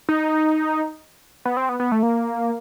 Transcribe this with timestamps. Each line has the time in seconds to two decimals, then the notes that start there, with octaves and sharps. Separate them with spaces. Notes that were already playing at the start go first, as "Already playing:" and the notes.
0.09 D#4
1.45 B3
1.57 C4
1.69 B3
1.80 B3
1.92 A3
2.03 A#3